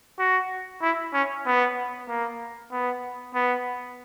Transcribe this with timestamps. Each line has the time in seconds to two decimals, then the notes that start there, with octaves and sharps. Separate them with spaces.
0.19 F#4
0.82 E4
1.13 C#4
1.46 B3
2.08 A#3
2.72 B3
3.35 B3